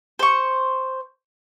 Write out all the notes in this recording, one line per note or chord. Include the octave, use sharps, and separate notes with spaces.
C5 C#6